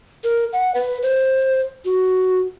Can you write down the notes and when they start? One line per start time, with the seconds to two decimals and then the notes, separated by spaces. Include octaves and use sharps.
0.24 A#4
0.53 F#5
0.75 B4
1.02 C5
1.85 F#4